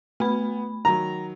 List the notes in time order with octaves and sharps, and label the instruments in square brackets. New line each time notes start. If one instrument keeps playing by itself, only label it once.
[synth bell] A3 B5 [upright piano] B3
[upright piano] D#3 F#3 [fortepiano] A#5